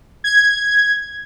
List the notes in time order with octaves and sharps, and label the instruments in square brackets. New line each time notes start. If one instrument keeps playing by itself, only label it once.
[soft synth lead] G#6